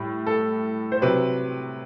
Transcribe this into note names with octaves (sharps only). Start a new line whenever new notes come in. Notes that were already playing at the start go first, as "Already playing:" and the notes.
Already playing: A2 G3
A4
C5
C3 F#3 B4